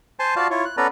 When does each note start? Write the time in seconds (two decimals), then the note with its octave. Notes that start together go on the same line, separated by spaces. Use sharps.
0.19 C5 G#5 A5 C6
0.36 F4 F#4 D5 F5 A5
0.51 E4 F4 C#5
0.65 F#6
0.77 B3 C#4 A4 B4 D5 A#5